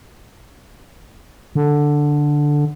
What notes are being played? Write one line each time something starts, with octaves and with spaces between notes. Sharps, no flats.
D3